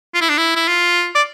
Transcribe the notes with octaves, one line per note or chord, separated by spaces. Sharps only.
F4
E4
D4
E4
E4
F4
D5